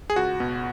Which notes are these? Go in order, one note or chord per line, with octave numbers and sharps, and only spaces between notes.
G#4
C#2 F#4
B2